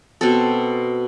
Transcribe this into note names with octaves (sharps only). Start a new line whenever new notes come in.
B2 C4 A4